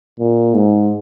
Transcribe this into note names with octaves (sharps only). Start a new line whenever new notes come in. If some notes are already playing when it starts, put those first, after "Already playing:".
A#2
G#2